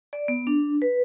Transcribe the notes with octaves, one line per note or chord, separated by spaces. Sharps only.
D5
B3
D4
B4